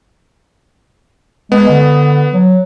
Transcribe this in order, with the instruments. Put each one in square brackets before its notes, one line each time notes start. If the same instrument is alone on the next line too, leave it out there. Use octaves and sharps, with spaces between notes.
[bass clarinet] G#3 [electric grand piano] B3
[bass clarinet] D3
F#3